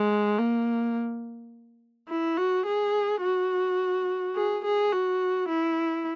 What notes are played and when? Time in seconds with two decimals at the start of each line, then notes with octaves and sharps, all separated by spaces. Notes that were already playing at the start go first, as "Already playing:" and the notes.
Already playing: G#3
0.39 A#3
2.09 E4
2.37 F#4
2.66 G#4
3.22 F#4
4.35 G#4
4.64 G#4
4.93 F#4
5.49 E4